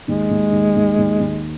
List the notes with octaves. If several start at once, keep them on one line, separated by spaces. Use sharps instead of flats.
D#2 G#3
D#2
D#2
D#2
D#2
D#2